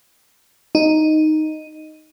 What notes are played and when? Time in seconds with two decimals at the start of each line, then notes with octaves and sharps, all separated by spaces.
0.75 D#4